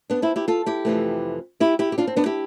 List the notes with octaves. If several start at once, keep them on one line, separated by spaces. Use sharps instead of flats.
B3 D4
C4 E4
E4 G4
F4 A4
E4 G4
F2 C3 E3 A3
E4 G4
E4 G4
G4
D4 F4
C4
B3 D4
E4 G4